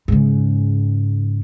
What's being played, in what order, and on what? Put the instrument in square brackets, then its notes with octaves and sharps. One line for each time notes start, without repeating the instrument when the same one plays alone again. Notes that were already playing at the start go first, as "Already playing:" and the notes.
[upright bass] G#2 C#3